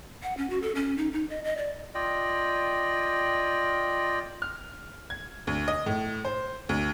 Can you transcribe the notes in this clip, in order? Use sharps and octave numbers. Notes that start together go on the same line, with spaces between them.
F#5
C#4
F#4
A4
C#4
D#4
D#4
D#5
D#5
D5
F4 D5 D#5 G5
F6
G#6
D2
D#5
A2
C5
D2